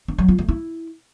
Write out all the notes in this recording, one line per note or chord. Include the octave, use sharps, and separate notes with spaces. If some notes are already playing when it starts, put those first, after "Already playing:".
D4
F#3
F4
A3
E4